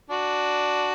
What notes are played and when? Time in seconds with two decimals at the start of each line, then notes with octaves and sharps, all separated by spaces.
0.11 D4 F#4